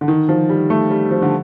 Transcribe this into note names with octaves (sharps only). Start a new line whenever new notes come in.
D3
D#3
F3
G3
A3
G3
F3
D3